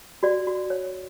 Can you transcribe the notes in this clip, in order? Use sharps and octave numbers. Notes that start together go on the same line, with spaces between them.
F#4 D5
F#4
C#5